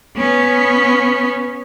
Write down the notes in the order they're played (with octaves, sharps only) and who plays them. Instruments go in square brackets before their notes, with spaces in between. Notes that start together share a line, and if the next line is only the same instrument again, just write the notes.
[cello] B3 C#4